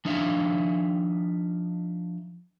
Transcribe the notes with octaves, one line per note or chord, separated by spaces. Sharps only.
F3 D4 D#4 E5 F5